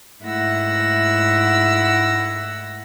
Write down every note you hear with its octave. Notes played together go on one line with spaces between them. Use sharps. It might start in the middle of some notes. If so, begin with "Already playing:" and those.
G#2 A3 E4 F#5 E6 A#6